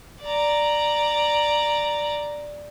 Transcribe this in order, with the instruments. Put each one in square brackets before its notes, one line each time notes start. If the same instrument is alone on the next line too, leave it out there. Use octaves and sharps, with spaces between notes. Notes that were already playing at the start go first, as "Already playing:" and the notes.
[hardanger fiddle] D5 A#5